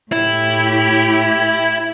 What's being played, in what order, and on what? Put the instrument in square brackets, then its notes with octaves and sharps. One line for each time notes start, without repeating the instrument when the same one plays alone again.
[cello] A2 G4 [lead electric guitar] E4